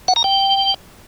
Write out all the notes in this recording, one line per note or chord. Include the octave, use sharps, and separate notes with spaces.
F#5
A#5
G5